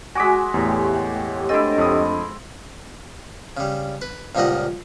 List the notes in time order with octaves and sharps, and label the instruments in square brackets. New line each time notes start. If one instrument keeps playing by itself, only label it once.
[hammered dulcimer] G#3 F#4 [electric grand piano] G#5 D6 B6
[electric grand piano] E2 A2 [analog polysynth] A3 G4 C#5
[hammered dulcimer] C4 E4 [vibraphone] D4 A4 D#5
[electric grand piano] F2 D#6
[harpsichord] C#3 G3
B4
C#2 A#2 F3 G3 D#5 F#5